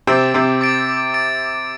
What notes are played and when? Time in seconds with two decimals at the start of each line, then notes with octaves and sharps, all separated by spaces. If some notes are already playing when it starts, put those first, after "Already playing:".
0.07 C3 C4 D6 A6 D7
0.34 C3 C4
0.61 D6 A6 D7
1.14 D6 A6 D7